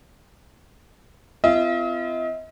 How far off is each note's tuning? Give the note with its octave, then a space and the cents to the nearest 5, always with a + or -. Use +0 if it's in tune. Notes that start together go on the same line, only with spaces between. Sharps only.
C4 -45 F4 -40 D#5 +40